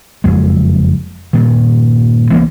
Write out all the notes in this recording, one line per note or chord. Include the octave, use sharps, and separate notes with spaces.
F#1 F2 G#3
G2 A#2 D#3
C2 E3 A#3 B3